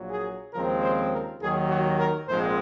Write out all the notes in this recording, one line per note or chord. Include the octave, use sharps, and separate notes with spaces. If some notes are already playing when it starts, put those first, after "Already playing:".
Already playing: A#1 A#2 F#3
G#4
D#2 C#3 F3 G#3 C4 A#4
C5
A#4
D#2 D#3 F#3 G#4
F#4
A#4
A#1 G#2 F3 G#3 C4 C5